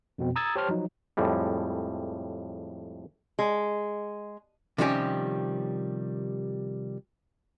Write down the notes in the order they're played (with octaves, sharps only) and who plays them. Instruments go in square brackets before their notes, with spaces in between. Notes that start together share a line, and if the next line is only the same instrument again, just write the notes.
[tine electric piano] F2 B2 C4
A#5 D#6 E6 G#6 A6
G4 C5 C#5 A5 C6 F6
F3 F#3 D#4
[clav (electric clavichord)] F2 A2 G3 G#3
[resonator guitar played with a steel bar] G#3
[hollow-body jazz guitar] C3 D#3 F3 G3 C#4 G4